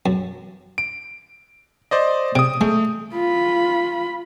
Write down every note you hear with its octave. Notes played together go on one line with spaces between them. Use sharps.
F#2
D7
C5 D5 D#5
C3 D#6 D7
G#3 A3
F4 B5